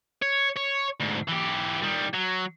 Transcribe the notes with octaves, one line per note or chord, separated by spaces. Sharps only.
C#5
C#5
D2 G#2
E3 G4
D#3 G3
F#3